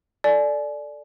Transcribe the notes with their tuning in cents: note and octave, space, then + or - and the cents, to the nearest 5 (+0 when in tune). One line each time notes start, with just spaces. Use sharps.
A4 +0 D5 +0 G#5 +35